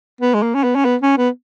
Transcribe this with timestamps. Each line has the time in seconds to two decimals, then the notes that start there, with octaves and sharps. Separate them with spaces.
0.21 B3
0.34 G#3
0.42 A#3
0.55 C#4
0.64 B3
0.75 C#4
0.85 B3
1.02 C#4
1.17 B3